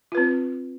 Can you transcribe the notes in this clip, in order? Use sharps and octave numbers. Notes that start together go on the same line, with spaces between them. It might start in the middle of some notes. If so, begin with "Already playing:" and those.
C4 F4 B4